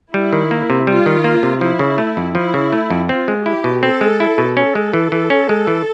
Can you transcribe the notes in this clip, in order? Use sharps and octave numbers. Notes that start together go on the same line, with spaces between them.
G3 E4
D#3
A#3
C3
G3 F4
D#3
A#3
C3
F3 E4
C#3
A3
F2
F3 E4
C#3
A3
F2
C4 F4
G#3
E4 G4
B2
C4 A4
G#3
E4
B2
C#4 A4
G#3
E3
E3
C#4
G#3
E3